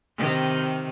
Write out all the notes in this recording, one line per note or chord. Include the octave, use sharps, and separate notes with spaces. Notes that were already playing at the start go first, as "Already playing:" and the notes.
C3 D#3